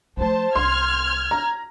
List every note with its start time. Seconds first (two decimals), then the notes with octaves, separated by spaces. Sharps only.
0.17 F3 A3 C5 A5
0.56 C2 C6 F6 G#6
1.31 A#5